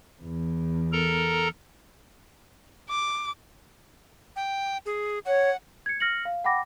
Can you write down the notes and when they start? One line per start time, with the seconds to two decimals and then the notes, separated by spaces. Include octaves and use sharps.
0.22 E2
0.92 A4 A#4 A#5
2.90 D6
4.36 G5
4.86 G#4
5.25 C#5 F#5
5.86 G#6 C#7
6.00 F6 A#6 C#7 F#7
6.25 F5
6.44 F#5 G5 B5 D6 A#6